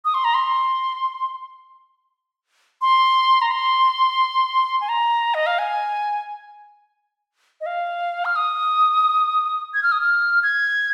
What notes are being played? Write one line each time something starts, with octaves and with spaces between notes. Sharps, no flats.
D#6
C6
A#5
C6
C6
A#5
C6
G#5
A#5
D#5
F5
G#5
D#5
F5
F6
D#6
G#6
F6
D#6
F6
G#6